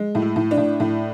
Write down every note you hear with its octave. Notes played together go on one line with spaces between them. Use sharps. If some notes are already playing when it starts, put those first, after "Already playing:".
Already playing: G#3
A2
E4
A2
D4
A2
A2